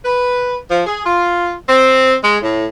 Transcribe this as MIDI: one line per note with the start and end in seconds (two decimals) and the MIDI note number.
0.05 0.56 71
0.69 0.85 53
0.86 1.00 68
1.05 1.51 65
1.68 2.15 60
2.22 2.38 56
2.42 2.65 45